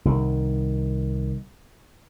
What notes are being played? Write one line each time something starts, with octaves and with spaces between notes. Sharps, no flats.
C2 D#3